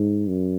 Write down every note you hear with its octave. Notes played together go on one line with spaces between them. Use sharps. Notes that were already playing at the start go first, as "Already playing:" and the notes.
Already playing: G#2
F#2